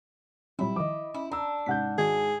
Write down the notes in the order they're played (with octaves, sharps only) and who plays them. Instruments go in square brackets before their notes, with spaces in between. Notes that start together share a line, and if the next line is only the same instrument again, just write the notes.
[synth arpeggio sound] A#2 F#3 C4 [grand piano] G3 B5 [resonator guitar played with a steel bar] E4
[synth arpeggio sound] D#3 F3 [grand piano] D#5 D6
[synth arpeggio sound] C#4 [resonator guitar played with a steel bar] E4
[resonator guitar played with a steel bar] D4 [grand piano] A#5 E6
[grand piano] G#2 F#5 G6 [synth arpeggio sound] C3 C#4 B6
[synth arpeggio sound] D#3 G#3 F#4 [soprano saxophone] G#4